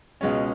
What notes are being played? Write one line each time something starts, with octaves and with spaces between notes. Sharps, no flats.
C#2 B2 G#3 C#4